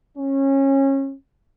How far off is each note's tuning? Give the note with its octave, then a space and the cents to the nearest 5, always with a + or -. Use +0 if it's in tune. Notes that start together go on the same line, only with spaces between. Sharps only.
C#4 -25